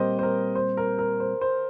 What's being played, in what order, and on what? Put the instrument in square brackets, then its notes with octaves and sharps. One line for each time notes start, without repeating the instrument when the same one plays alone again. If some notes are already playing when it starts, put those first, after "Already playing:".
Already playing: [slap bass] A#2 G3 C4 [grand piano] G4 A#4 C5 D#5
[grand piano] C5
A#4
C5
A#4
A#4
C5
C5